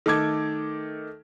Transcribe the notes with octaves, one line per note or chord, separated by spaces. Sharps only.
D#3 A3 A4 D6 G#6